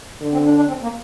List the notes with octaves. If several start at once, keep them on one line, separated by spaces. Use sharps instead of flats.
D3
C4
D4
D4
C4
A#3